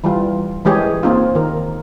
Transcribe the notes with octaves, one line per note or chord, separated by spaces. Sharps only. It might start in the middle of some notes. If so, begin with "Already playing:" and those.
E3 G3 F4
E3 G#3 G4 G#4 C#5
A#3 C4 D#4 F4
D#3 A#4